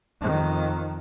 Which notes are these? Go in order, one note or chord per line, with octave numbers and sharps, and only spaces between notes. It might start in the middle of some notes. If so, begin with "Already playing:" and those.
F2 D#3